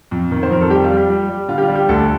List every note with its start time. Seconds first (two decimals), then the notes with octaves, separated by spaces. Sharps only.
0.11 F2
0.31 D#3
0.43 C5
0.50 F2 A#4
0.61 A4
0.70 G3 G4
0.84 F4
0.90 G3
0.97 G4
1.09 G3
1.29 G3
1.48 D3 F4
1.58 G4
1.63 F4
1.68 G3
1.75 G4
1.89 D2 A4